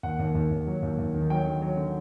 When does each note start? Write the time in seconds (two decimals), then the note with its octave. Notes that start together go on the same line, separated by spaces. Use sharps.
0.03 D#2 F#5
0.19 D#2
0.35 D#2
0.51 D#2
0.67 F#3
0.83 D#2
0.98 D#2
1.14 D#3
1.30 F#3 G5
1.46 D3
1.62 F#3
1.77 D3